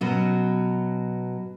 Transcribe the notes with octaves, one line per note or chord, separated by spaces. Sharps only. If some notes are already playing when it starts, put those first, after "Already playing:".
B2 F#3 C#4